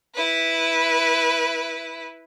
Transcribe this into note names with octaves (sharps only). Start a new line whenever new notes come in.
E4 B4